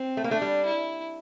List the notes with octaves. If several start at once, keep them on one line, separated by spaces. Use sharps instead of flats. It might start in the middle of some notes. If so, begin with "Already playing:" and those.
Already playing: C4
A3
A#3
A3 D4
G3
E4